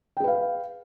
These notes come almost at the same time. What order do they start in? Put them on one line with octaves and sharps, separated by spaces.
G5 G#4 B4 F5